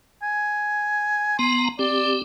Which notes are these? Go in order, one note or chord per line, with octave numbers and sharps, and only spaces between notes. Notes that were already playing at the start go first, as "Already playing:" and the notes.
G#5
B3 A#5 C6
C4 G4 D5